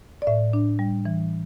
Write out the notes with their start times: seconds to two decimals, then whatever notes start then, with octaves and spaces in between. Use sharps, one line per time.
0.22 D5
0.27 A2 E5
0.53 D4
0.79 G3
1.05 E3